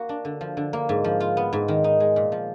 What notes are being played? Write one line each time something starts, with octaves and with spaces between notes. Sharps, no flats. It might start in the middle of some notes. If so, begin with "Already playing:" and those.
Already playing: A#3 F#4
D4
D3
F3
D3
A#3
G#2
F3
F4
B3
G#2
D#3
D#4
G#3
A#2
F3